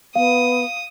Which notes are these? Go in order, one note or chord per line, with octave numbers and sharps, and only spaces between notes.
B3 F5 D#6